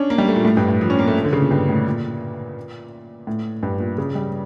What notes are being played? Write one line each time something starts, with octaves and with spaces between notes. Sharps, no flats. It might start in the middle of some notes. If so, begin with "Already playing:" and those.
Already playing: C#4 D4
A#3
G3
A3
A#2
A2
G2
A2
F3
C#4
A#3
A3
D3
C#3
A#2
G2
A2
A#2
A2
G2
A#2
C#3
G3